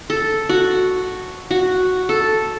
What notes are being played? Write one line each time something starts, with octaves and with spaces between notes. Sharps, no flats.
A4
F#4
F#4
A4